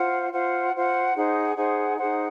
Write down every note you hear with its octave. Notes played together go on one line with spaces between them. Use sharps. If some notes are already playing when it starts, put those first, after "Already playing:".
Already playing: F4 C5 F#5
F4 C5 F#5
F4 C5 F#5
D#4 G#4 C5 F#5
D#4 G#4 C5 F#5
D#4 G#4 C5 F#5